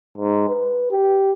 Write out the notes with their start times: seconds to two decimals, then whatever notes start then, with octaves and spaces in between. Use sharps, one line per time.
0.18 G#2
0.49 B4
0.92 G4